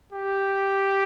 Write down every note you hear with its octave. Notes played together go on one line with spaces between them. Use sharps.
G4